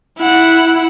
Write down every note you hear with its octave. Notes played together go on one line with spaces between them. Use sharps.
E4 F#5